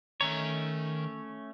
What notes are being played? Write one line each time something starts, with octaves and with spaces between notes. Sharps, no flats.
D#3 A3 C#4 C#5 A#5